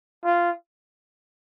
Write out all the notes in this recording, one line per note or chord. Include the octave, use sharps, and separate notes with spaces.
F4